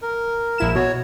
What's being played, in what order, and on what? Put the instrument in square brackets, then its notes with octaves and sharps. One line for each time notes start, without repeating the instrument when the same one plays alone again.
[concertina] A#4
[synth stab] A#1 E4 E7
[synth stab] B2 [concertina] F#4 C#5